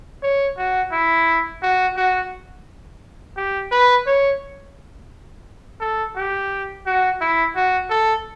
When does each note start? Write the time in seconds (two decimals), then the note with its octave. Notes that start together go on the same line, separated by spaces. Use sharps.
0.23 C#5
0.58 F#4
0.92 E4
1.63 F#4
1.97 F#4
3.37 G4
3.71 B4
4.07 C#5
5.81 A4
6.16 G4
6.86 F#4
7.21 E4
7.56 F#4
7.90 A4